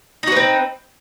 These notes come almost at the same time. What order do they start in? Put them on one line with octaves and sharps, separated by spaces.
D#4 F#4 B4 C4